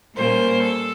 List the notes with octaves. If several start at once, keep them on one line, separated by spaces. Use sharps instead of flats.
A#2 G3 A#3 C#4 C5
A4